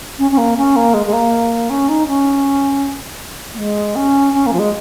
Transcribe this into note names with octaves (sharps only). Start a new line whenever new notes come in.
C#4
C#4
A#3
C#4
A#3
G#3
G#3
A#3
C#4
D#4
C#4
A#3
G#3
C#4
C#4
A#3
F3
G#3